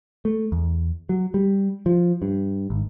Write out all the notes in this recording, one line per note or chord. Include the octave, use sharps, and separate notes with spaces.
A3
E2
F#3
G3
F3
G2
G#1